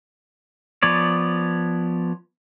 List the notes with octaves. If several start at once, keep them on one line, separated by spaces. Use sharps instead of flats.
F3 B3 C#5 D5